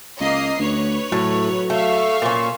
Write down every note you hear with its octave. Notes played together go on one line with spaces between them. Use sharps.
C#2 A#3 D#5 C7
D2 B4 C#5
A2 F#3
A3 E5 F5 C#6
A#2 C#4